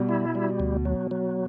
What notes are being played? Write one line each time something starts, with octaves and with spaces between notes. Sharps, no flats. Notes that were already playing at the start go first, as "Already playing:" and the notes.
Already playing: B2 G3
E4
G3
D2
F#3
F#3